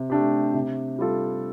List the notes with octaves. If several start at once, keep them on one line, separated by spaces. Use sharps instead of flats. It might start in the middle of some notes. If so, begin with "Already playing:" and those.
Already playing: C3
A3 D4 G4
C3
G3 F4 A4